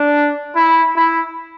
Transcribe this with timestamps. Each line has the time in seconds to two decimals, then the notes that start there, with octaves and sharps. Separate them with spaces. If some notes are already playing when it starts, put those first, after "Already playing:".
Already playing: D4
0.56 E4
0.96 E4